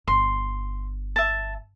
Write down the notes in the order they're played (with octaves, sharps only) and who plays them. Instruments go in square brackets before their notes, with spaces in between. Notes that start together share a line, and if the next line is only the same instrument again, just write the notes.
[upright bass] G1 [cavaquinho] C6
[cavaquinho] E5 A5